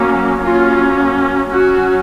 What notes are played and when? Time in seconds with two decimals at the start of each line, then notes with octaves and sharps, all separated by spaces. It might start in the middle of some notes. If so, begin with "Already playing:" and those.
Already playing: F#3 A#3 C#4
0.42 F#3 A#3 C#4 F4
1.51 F#3 C#4 F#4